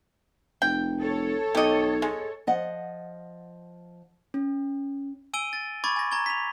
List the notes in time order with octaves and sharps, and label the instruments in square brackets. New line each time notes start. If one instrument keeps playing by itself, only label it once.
[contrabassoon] F1 [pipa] G5
[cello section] A4 C#5
[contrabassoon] B1 [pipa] G4 D#5
[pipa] G#3
[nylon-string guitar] F3 D#5 F#5
[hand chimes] C#4
[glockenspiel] G#5 E6 D7 D#7 G7
A6
B5 C#6 D6 G#6 A6
G#5 A#6
A#5 C#6 G#6 G7
B6 F7